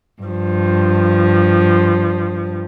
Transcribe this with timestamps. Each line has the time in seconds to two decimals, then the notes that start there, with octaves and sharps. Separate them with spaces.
0.23 G2 F3